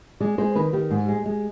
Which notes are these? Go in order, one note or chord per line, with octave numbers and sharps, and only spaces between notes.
G#3 D5
G#3 C5
D#3 B4
D#3 G4
G#2
G#3
G#3